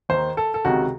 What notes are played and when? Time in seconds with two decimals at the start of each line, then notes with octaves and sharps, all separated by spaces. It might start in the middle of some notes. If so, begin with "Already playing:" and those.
0.09 D#2 D#3 C5
0.37 A4
0.54 A4
0.65 C#2 C3 D#3 F#4